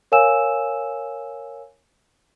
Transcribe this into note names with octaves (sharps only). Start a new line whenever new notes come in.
A#4 C#5 F5 G#5 E6 E7